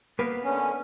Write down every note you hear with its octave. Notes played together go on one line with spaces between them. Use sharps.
A#3 B3 B4
D3 C#4